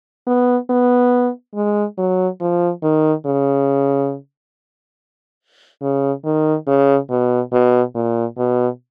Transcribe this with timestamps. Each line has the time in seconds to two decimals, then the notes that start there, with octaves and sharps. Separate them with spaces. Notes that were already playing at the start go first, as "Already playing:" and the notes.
0.27 B3
0.70 B3
1.55 G#3
1.98 F#3
2.41 F3
2.83 D#3
3.26 C#3
5.82 C#3
6.25 D#3
6.67 C#3
7.10 B2
7.53 B2
7.95 A#2
8.38 B2